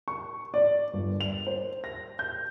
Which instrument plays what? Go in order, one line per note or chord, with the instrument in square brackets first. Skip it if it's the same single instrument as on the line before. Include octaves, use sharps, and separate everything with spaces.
[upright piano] C#6
D5
G1
F7
C5
A#6
G6